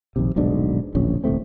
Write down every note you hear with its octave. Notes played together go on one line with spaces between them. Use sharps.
A#1 D#2 C3
D#1 B1 G#2 D4
D1 A#1 C#4
D#1 C2 A3 C4